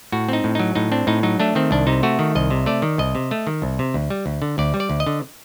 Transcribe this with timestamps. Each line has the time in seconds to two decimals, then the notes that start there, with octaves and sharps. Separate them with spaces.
0.12 A2 F#4
0.29 C4 D#4
0.44 A2
0.55 F#3 D#4
0.75 A2 D#4
0.92 C4 D4
1.07 A2 D#4
1.23 F#3 D#4
1.40 A3 D4
1.55 D#3 C4
1.71 C2 D4
1.87 C3 D#4
2.03 A3 F#4
2.19 D#3
2.35 C2 D#5
2.51 C3
2.66 A3 D5
2.82 D#3
2.98 C2 D#5
3.15 C3
3.31 A3
3.47 D#3
3.62 C2
3.79 C3
3.94 D2
4.10 G3
4.26 D2
4.42 D3
4.58 D2 D5
4.74 G3
4.80 D5
4.90 D2
5.00 D#5
5.07 D3